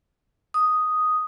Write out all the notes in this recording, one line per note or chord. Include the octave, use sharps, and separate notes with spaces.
D#6